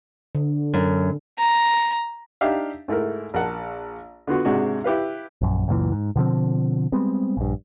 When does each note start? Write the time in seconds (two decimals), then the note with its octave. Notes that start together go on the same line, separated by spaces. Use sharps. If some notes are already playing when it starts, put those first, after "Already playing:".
0.35 D3
0.74 F#2
1.38 A#5
2.41 D4 D#4 G4 E5 F5
2.88 G#2 A3 E4 A#4
3.34 A#1 A#4 F#5 A5
4.27 D3 B3 F4 F#4
4.45 G#2 C3 G#3 D4 F#4
4.84 E4 G4 B4 F5
5.42 A#1 F#2
5.68 C#2 F#2 A#2 E3
5.92 G#2
6.16 B2 D3 F3 C4
6.92 G3 G#3 B3 C4
7.37 A#1 G2